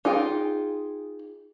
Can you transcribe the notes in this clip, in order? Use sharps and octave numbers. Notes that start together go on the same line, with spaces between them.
D#4 F4 G#4 G5